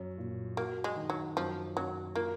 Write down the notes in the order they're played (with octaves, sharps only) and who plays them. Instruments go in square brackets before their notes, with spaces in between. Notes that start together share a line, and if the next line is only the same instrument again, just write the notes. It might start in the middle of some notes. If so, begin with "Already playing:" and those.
Already playing: [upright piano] F#2 C#4
A#2
[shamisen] A#3 [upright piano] F#4
[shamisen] G#3
[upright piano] D#3
[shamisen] F#3
[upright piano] F#2 [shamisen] F3
[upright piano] F#2 [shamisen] F#3
[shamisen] A#3 [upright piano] F4